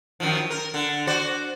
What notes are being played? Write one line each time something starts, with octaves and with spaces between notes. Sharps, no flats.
F#2 D#3 F3
A#4
D3
F#4 C5 D5